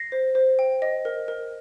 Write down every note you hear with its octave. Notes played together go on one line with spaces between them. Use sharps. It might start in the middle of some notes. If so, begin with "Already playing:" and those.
Already playing: A#6 C7
C5
C5
G5
D#5
A#4
A#4